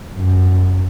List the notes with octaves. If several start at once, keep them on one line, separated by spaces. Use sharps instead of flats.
F#2